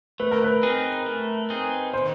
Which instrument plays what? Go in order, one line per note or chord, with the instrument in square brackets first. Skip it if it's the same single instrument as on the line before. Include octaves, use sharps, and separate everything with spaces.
[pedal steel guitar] A3 [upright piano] B4
[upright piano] A#4
B4
[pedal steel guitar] C4 D#4 G#4
A3
C4 D#4 G#4
[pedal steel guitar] D#3 [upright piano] C5